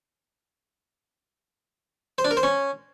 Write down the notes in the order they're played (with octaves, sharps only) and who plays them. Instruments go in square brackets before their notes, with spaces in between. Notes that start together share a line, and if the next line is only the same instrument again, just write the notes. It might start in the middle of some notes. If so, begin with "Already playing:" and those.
[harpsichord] C5
D4
A#4
C5
C#4